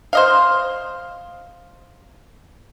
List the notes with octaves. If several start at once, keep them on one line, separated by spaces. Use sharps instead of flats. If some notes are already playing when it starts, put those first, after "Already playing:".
C5 D#5 F5